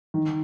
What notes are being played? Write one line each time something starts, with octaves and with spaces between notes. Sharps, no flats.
D#3